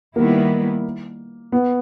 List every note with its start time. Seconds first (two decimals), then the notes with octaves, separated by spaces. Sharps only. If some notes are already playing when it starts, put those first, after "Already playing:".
0.16 D#3 G3 A#3 B3 E4
1.52 B3